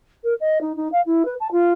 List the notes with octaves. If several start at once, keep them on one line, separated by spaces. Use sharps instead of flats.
A#4
D#5
D#4
D#4
F5
E4
B4
A5
F4